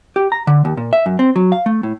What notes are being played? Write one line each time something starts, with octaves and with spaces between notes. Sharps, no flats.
G4
A#5
D3
D#2
A#2
E5
F#2
C4
F#3
F5
A3
A2